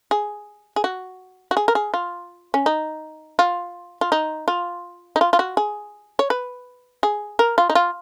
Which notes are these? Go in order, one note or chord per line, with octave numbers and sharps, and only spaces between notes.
G#4
G#4
F#4
F#4
G#4
A#4
G#4
F4
C#4
D#4
F4
F4
D#4
F4
D#4
F4
F4
F#4
G#4
C#5
B4
G#4
A#4
F4
D#4
F4